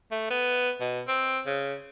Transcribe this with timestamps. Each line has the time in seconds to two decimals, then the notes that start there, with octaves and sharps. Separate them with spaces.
0.11 A3
0.30 B3
0.81 B2
1.08 C4
1.46 C#3